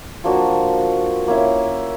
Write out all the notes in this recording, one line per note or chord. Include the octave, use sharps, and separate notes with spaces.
F3 A#3 D4 F#4
A#3 C#4 E4